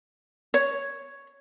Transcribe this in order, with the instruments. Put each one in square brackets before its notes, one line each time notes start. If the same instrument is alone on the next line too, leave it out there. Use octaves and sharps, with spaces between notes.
[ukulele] C#5